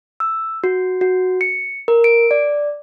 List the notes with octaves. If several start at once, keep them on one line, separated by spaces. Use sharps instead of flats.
E6
F#4
F#4
C#7
A#4
D7
D5